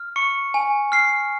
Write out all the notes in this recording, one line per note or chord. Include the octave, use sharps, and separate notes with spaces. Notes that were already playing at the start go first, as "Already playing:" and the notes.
Already playing: F6
C#6 C#7
G#5
F6 C7